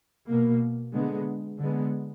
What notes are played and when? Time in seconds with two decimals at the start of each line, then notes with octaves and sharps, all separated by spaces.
0.27 B2 A#3
0.92 D3 G#3 B3
1.58 D3 G#3 B3